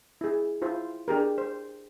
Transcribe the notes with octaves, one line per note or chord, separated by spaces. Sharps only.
E4 G#4
E4 F4 C5
D4 G4 G#4 A#4
C5